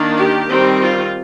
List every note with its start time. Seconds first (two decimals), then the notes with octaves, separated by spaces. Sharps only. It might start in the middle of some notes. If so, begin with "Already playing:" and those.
Already playing: D#3 A#3 D4
0.16 G4
0.49 D#3 G3 C4
0.80 F4